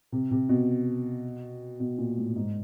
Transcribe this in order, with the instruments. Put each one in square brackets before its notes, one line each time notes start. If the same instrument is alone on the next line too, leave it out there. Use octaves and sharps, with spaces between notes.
[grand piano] C3
C3
B2
B2
A#2
A2
G#2